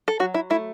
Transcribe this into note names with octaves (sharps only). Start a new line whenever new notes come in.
A4
F#3 F#4
E4
A3 E4